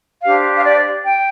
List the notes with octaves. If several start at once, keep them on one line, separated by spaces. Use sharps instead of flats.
D4 G4 C5 F5
F5
D5
G5